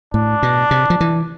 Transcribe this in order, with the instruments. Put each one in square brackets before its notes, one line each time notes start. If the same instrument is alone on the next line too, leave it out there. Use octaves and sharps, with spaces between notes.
[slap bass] A2 [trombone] D4
[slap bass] B2
C3
F3
E3